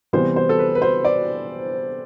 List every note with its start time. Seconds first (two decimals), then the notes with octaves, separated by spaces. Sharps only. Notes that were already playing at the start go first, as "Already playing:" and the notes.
0.13 C3 E3 G3 B3 C5
0.36 C5
0.49 A4
0.59 B4
0.75 B4
0.82 C5
1.05 D5